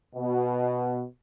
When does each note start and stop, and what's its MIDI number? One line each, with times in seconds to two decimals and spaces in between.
0.16 1.02 47